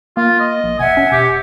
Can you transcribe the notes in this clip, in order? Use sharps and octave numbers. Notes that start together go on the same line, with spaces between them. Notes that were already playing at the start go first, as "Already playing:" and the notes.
A#3 F4
D#5
A#1
F1 E5 F#5 G#5
C#4
E1 G4